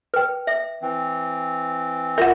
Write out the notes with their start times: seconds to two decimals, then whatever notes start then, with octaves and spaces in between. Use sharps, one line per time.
0.14 B4 G5
0.47 E5
0.82 E3 C4
2.18 F4 A#4 E5 F#5